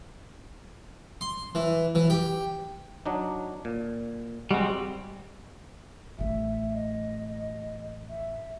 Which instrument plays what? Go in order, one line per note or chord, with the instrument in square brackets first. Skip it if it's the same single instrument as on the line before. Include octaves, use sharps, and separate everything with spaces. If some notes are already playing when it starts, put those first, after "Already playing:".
[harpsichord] C6
E3
E3
G4
[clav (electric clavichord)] F#3 D4 D#4
A#2
[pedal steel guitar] G3 C4 [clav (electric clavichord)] G#3 F#4
[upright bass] A1 A3 [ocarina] E5
[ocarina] D#5
E5